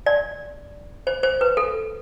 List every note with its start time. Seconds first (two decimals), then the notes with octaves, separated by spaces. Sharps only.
0.06 D5
1.07 C5
1.23 C5
1.41 B4
1.57 A4